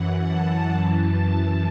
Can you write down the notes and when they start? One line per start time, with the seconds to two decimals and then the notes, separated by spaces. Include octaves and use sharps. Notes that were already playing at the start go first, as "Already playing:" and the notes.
Already playing: F#2 E3 F#5
0.28 A5
0.71 F#2 E3 A5